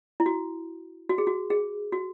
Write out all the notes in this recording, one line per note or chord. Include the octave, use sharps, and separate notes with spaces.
E4
F#4
F#4
G#4
F#4
G#4
F#4